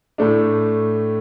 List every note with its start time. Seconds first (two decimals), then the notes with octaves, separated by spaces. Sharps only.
0.18 A2 A3 D4